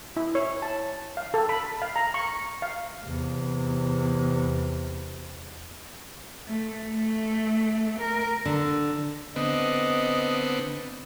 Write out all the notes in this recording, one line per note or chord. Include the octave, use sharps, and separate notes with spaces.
E4
C#5
A5
F5
A4
B5
F5
A#5
C#6
F5
E2 C3
A3
A3
A#4
D3
D3 B3 C4 D#5